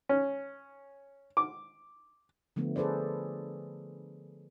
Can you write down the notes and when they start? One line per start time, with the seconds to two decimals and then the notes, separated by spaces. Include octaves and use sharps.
0.09 C#4
1.37 D6
2.56 D3 F3 A3 B3
2.76 G#4 A4 B4 C5 D5